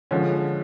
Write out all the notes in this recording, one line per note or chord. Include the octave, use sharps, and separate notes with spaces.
D3 F3 G#3 C#4